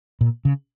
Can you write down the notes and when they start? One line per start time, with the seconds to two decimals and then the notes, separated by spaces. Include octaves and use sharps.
0.21 A#2
0.45 C#3